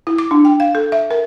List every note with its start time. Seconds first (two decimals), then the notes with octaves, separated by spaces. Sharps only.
0.07 E4
0.19 D6
0.31 D4
0.45 G5
0.60 F5
0.75 A4
0.92 E5
1.11 A#4